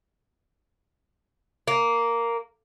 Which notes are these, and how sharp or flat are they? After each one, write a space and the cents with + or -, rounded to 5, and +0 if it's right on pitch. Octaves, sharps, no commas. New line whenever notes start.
A#3 -5